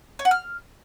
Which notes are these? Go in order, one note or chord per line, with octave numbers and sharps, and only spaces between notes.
C#5
F#5
F6